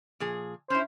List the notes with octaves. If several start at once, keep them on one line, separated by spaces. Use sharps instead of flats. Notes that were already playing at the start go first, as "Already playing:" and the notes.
A#2 F3 G#4
C#4 E4 C5